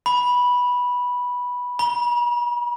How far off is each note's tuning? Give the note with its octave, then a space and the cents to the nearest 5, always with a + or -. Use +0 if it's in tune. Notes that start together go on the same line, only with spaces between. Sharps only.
B5 -10
B5 -45